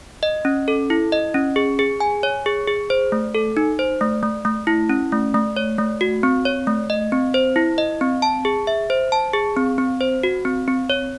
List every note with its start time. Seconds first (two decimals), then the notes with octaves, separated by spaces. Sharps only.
0.23 D#5
0.45 C#4
0.68 A4
0.90 E4
1.12 D#5
1.34 C#4
1.56 G#4
1.79 G#4
2.00 G#5
2.23 C#5
2.46 G#4
2.67 G#4
2.90 C5
3.12 A3
3.35 A4
3.57 D#4
3.79 C5
4.01 A3
4.23 A3
4.45 A3
4.67 E4
4.89 C#4
5.12 A3
5.34 A3
5.57 C#5
5.79 A3
6.01 F#4
6.23 C4
6.45 C#5
6.67 A3
6.90 D#5
7.12 C4
7.34 C5
7.56 E4
7.78 D#5
8.01 C4
8.22 A5
8.45 G#4
8.67 E5
8.90 C5
9.12 A5
9.33 G#4
9.57 C4
9.78 C4
10.01 C5
10.23 F#4
10.45 C4
10.68 C4
10.90 C#5